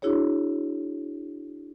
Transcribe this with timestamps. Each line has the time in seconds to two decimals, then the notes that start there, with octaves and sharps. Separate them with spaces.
0.02 D4 E4 F#4 G#4 C#5